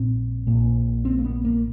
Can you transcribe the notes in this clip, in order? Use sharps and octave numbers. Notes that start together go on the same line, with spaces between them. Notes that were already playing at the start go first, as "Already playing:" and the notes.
Already playing: A#1 A#2 C4
A#1 A#2
C4
A#3
B3
A#3